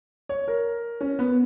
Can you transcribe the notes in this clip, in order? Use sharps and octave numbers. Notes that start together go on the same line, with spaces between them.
C#5
A#4
C#4
B3